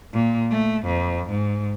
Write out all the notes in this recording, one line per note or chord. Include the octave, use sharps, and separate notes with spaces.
A#2
A3
F2
G#2